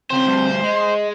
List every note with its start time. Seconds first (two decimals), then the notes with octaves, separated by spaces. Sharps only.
0.10 C#3 C4 C5 G5
0.25 D2 G2
0.63 G#3 D#5